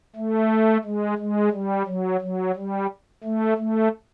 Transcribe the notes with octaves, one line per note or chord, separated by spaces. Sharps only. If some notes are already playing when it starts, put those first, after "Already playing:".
A3
G#3
G#3
G3
F#3
F#3
G3
A3
A3